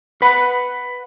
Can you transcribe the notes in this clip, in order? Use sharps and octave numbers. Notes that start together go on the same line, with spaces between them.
B4 F#5 B5